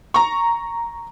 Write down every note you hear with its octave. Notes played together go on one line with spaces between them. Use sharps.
A#5 C#6